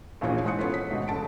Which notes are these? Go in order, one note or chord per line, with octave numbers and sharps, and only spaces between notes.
A#1 D#2 A#2 E3 C#4 G#4
G#2 E3 C5 D#6 F#6 C#7
B3 C#4 F4 A4 B4
B6
G#2 B2 D#3
F1 C#3 A5 D7